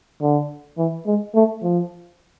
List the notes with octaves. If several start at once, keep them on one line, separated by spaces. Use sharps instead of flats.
D3
E3
G#3
A3
F3